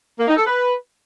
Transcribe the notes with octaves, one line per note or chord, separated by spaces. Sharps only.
A#3
D#4
A4
B4